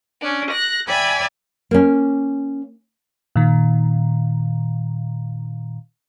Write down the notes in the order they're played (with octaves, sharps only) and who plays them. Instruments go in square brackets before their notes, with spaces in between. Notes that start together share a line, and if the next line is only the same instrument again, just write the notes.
[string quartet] C#4 D4
F#6 A#6
D5 E5 G5 G#5 B5
[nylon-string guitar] A#3 C#4
[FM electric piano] A#2 D#3